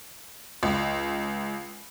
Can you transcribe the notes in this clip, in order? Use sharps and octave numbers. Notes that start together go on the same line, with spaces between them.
C#2